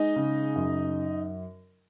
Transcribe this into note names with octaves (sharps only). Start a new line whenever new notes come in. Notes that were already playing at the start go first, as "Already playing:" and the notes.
Already playing: G#3 D#4 D#5
C#3
F#2